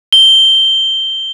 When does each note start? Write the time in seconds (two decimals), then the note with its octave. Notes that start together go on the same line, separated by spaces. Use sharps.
0.13 G7